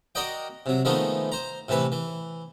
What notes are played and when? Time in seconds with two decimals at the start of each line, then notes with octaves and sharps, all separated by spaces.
0.15 F#4 A#4 D5 D#5 G5
0.66 C3 F#3
0.85 D#3 F3 G#3 A3 B3 D#4
1.32 C5 A#5
1.69 A2 C3 E3 B4
1.92 E3